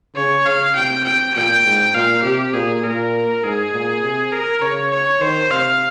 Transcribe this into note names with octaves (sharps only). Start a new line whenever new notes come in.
C#3 C#5
C#3 F5
C3 G5
G5
A#2 G5
G#2
A#2 F5
C3 G4
A#2 G#4
A#2 A#4
G#2 G#4
A#2
C3
A#4
C#3 C#5
C#5
D#3 C5
C3 F5